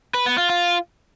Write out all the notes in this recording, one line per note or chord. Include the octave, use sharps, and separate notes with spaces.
B4
B3
F4
F4